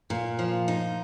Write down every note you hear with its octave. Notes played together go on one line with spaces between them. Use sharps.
A#2
F3
D#4